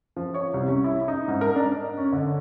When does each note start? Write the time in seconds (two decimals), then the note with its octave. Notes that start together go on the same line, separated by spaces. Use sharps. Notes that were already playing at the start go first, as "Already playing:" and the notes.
0.17 F3
0.34 C#5
0.54 C2
0.68 C#4
0.84 E4
1.08 D#4
1.28 G#2
1.41 A#4
1.56 D4
1.75 D#5
1.98 C#4
2.13 D3